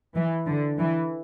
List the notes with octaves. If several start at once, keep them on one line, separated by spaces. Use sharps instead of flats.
E3
D3
E3